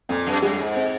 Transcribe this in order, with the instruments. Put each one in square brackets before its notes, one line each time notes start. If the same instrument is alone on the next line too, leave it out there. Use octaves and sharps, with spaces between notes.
[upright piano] F2 [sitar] A#2
[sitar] F#2
[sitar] F#2 [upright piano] G#3
[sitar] G#2
[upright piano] C4